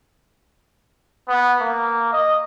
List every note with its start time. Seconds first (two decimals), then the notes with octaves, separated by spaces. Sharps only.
1.28 B3
1.60 A#3
2.13 D#5